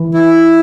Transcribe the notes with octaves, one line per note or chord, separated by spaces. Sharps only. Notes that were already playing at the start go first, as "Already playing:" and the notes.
Already playing: E3
E4